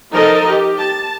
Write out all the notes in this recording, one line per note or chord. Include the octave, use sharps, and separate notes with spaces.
F3 D#4 A4 A#4 D#5
G4
A5